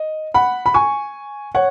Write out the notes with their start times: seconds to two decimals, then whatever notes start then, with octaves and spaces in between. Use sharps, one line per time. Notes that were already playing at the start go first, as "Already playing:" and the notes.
Already playing: D#5
0.34 F#5 B5
0.66 B5
0.74 G#5 C#6
1.55 C#5 F#5